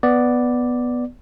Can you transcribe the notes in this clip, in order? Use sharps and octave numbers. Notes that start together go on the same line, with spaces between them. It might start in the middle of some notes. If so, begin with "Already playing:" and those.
B3 D5